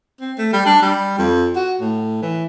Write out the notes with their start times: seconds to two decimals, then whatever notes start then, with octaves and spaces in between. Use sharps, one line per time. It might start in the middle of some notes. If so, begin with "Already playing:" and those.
0.21 C4
0.38 A3
0.53 G3
0.66 D4
0.82 G3
1.19 F2
1.56 F#4
1.81 A2
2.22 E3